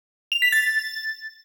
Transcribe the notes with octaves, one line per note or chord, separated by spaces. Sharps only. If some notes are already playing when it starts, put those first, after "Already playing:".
F7
B6
A6